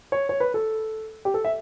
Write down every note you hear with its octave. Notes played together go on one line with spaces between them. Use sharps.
C#5
C#5
B4
A4
G4
A4
E5